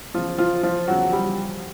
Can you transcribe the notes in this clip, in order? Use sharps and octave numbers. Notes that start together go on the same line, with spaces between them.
E2 C#3 F3 F4
F3 F4
F3 F4
E2 C#3 F3 F#3 F#4
G3 G4